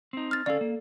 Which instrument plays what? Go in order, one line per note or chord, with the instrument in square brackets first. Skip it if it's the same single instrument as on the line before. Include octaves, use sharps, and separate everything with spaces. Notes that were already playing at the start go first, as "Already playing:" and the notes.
[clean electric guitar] C4 D#4
[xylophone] F6 A6
[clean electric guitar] D2 C#4 F5 [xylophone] A4 D5
[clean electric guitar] A#3